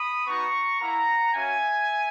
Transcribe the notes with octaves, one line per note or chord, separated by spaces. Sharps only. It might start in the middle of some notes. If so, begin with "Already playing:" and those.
Already playing: B5 D#6
B3 D#4 F#4 A#5 C#6
A#3 E4 F#5 A#5
A#3 C#4 F#4 E5 G#5